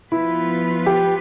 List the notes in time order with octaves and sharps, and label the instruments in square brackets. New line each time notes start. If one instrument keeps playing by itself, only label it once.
[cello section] F3 B3 F4 B4 [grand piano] E4
[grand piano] G4